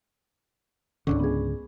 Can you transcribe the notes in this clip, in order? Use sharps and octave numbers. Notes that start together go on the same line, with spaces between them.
C#2 G#2 D3 C#4 D4
B3 G#4